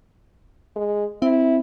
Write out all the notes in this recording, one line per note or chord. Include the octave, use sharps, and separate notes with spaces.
G#3
C4 E4